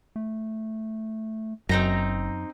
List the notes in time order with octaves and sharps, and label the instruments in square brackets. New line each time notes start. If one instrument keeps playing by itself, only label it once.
[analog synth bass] A3
[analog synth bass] F#1 [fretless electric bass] F#2 [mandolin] C4 D#4 A#5